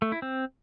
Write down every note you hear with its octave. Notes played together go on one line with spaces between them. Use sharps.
A3
E4
C4